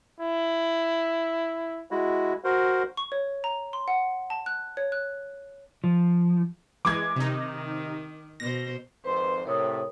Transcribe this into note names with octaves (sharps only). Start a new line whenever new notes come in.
E4
G#3 E4 F#4
F#4 A#4 C5
C#6
C#5
A#5
C6
F#5
A5
F#6
C#5
F#6
F3
E3 G#3 D6 G#6
C3 D#3 D#4
B2 C5 A#6
G#1 F2 B4 C5 C6
A2 C3 A#4 C#5 D#6